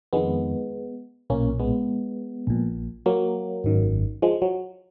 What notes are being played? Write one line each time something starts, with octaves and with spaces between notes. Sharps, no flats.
F2 D#3 G#3 B3
B1 A#2 A#3 C#4
G#3 B3
A#1 A#2
F#3 A#3
G#1 F#2 D#3
F3 G#3
F#3